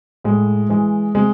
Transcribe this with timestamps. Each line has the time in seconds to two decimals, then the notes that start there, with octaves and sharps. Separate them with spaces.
0.24 A2 G#3
0.69 E3 G#3
1.15 C3 G#3